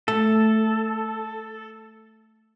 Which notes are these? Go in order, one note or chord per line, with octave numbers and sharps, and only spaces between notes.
A3 A4